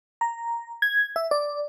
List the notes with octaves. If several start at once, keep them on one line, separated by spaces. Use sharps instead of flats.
A#5
G#6
E5
D5